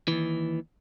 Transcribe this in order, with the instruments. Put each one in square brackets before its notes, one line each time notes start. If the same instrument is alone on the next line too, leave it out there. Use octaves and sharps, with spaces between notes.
[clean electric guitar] D#2 E3